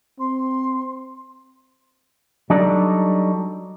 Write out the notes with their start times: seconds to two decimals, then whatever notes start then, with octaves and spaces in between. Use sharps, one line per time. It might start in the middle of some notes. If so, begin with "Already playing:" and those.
0.19 C4 C6
2.50 F#3 G3 D4 D#4 A4 D5